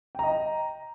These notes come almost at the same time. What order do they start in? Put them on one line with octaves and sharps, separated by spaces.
G5 A#5 D#5